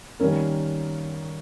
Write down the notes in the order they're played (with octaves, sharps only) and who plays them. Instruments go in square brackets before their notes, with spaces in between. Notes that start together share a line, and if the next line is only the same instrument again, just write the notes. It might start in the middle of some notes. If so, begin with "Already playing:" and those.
[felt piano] D#3 G3 A#3 C#4 A#4